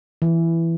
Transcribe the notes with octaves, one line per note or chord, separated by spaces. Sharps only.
E3